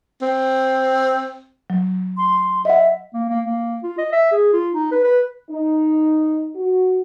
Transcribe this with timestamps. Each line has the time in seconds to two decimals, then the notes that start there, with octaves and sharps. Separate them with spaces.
0.22 C4
1.70 F#3
2.17 C6
2.65 D#5 E5 F#5
3.14 A#3
3.29 A#3
3.46 A#3
3.83 F4
3.98 D#5
4.13 E5
4.32 G#4
4.53 F4
4.73 D#4
4.92 B4
5.04 B4
5.50 D#4
6.56 F#4